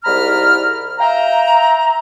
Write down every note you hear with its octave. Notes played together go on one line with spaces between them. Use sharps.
C2 G#2 D5 A#5 B5 F6
E5 F5 G5 A#5